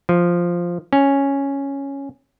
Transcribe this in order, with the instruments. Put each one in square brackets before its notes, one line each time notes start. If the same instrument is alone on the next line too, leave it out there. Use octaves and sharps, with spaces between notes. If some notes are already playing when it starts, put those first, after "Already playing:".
[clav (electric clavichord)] F3
C#4